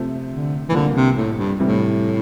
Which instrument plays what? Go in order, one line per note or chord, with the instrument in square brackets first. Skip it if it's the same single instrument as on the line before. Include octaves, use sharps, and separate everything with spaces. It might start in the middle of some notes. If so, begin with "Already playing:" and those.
Already playing: [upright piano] C3 F3 A3 C4
[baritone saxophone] D3
E3
[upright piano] C2 A#2 F3 A#3 [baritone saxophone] D3
[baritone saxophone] C3
A2
G2
[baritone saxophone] A2 [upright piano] C3 E3 G3